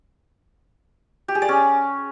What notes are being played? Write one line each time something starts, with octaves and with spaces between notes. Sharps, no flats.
G4
G#4
D5
C#4